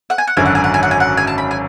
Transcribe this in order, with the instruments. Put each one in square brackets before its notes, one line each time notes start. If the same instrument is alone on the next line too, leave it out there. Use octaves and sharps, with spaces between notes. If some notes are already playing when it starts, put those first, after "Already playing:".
[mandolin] F#5
G#5
F#5
[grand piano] G#1 F#2 D3 F#3 [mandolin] G#5
[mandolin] F#5
G#5
F#5
G#5
F#5
G#5
F#5
G#5
A5
B5
G#5